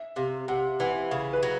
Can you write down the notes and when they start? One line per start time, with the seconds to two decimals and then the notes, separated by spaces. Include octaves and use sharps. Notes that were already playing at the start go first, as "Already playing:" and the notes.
Already playing: E5
0.16 C3 F5
0.48 C3 F#5
0.80 E3 F#5
1.11 C#3 F5
1.33 B4
1.43 F#3